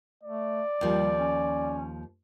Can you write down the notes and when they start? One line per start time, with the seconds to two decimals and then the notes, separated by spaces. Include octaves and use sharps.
0.23 A3 D5
0.81 D#2 F3 G3
1.18 C#4